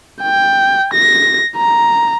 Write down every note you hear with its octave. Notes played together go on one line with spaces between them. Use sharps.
G5
A#6
A#5